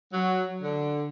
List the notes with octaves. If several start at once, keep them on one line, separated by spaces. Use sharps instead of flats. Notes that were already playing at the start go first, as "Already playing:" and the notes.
F#3
D3